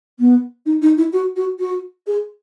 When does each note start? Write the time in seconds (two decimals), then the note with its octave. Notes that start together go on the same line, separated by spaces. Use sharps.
0.19 B3
0.65 D#4
0.82 D#4
0.97 E4
1.12 F#4
1.36 F#4
1.59 F#4
2.06 G#4